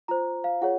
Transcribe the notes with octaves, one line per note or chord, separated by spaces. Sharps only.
F4 C5 A#5
F5
F4 G#4 C#5 F#5